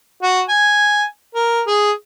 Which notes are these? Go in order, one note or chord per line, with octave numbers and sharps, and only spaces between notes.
F#4
G#5
A#4
G#4